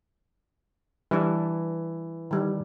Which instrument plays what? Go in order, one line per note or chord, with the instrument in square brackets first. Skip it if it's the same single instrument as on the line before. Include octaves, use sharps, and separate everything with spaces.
[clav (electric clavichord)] E3 [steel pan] G3 D4
[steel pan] D#3 G3